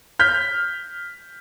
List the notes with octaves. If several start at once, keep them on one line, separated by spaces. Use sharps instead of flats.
F6 G6 B6